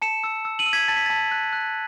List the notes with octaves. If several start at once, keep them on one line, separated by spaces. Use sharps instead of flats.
A5 C#7 E7
E6
E6
D#7 F#7
E6
G#6 B6
A5 A6
B6
A5 A6
F#6
F#6